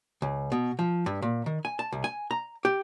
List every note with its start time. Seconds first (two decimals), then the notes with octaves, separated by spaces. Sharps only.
0.22 C#2
0.52 B2
0.79 F3
1.06 G2
1.22 A#2
1.46 D#3
1.65 G#5
1.79 A5
1.93 C2
2.04 G#5
2.31 A#5
2.65 G4